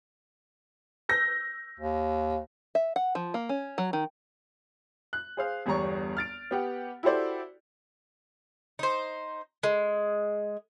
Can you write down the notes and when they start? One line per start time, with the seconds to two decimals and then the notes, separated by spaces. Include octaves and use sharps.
1.09 E6 G6 A#6
1.79 D#2
2.75 E5
2.96 F#5
3.15 F3
3.34 A#3
3.49 C#4
3.78 F#3
3.93 D#3
5.13 F#6
5.37 G#4 C5 F5
5.66 G1 E2 G3 C#5 A#5 C#6
6.17 F6 A6 D7
6.51 B3 G4 F#5
7.03 E4 F#4 G4 A4 C5 D5
8.79 D#4 C5
9.63 G#3